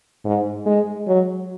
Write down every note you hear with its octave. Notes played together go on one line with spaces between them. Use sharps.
G#2
G#3
F#3